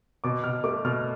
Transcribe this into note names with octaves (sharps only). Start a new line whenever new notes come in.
B2 D6
B2 F6
A3 D6
B2 F6